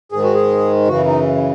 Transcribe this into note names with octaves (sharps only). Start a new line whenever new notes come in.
G#2 D#3 G#3 G#4
F#4
G#4
F#2 C#3 E3 F#4
D#4